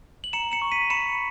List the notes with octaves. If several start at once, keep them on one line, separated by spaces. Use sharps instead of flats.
F#7
A#5 C#7 E7
C#7 E7
C#6
B6 D#7
B5 C#7 E7